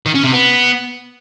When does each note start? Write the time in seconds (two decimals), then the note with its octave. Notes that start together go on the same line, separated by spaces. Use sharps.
0.06 D#3
0.15 C#4
0.24 C3
0.32 B3